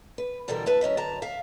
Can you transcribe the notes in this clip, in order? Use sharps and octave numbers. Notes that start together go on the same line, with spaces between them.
B4
B2 D3 E3 G3 A4 A#4
D2 B4 E5 A5
F#3 C#4 D#5 E5
F#2 D3 A5 A#5
E5 F5